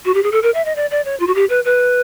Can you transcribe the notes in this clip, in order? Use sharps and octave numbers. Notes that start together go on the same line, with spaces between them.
F#4
G4
G#4
A4
A#4
E5
D#5
D5
D5
C#5
F4
F#4
G4
B4
B4